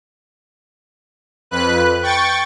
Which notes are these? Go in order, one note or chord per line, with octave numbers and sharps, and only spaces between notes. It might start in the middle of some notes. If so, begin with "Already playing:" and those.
F2 B4 F#6
G5 C#6 A6